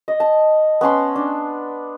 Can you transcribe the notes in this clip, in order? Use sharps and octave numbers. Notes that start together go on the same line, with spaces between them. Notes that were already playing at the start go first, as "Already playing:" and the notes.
D#5
A5
B3 C#4 A5 C6
D4